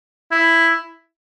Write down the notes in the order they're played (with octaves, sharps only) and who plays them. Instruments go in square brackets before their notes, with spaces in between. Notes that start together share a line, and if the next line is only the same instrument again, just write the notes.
[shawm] E4